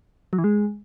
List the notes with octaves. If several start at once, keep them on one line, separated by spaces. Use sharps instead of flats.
F#3
E3
G#3